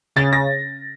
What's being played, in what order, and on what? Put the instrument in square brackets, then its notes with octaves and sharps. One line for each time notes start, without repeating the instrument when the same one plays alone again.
[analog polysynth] C#3 [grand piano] A6
[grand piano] A#6